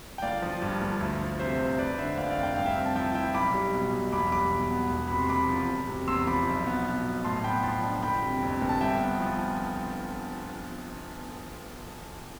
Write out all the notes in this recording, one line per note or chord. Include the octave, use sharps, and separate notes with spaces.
G5
G1 D5 F5
F3
G2
G1
D2
F3
C3 C5 E5
D2 C5 E5
F1 B4 D5
D3 C5 E5
F2 D5 F5
D5 F5
F1
G5
G2 F5
E5 G5
C4
A5
F3 E5 G5
E4 E5 G5
B1 B5 D6
G3
B2
B1
E2 B5 D6
G3 B5 D6
B2
B3
E1
C3 B5
C6
E2 B5 D6
F3
E1
C3
E2 C6 E6
F3 B5 D6
B1
B3
B2
B1
A2 A5 C6
B3 G5 B5
F3 A5 C6
D4
G1 G5 B5
C3
F2
G1
A5
G2 E5 G5
B3
F3